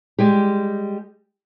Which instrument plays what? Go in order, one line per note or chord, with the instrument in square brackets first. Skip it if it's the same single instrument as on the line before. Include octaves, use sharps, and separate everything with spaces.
[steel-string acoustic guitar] G3 G#3 G4